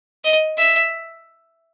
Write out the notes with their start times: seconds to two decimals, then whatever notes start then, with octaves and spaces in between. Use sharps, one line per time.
0.24 D#5
0.57 E5